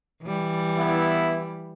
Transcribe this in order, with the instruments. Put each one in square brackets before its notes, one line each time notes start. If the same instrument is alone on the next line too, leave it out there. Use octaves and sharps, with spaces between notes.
[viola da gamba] E3 G3
[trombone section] B3 E4